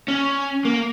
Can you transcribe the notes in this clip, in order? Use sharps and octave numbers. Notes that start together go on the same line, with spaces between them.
C#4
A#3